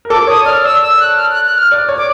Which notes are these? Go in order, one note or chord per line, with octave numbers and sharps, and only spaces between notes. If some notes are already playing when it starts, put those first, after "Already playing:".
A#4
A4 D6
C#5 D#6
D5 F6
D5 E6
E6
F#6
F6
F#6
F#6
F6
D5
C#5
D6